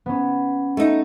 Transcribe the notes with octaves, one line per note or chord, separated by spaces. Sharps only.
B3 C#4
A3 D#4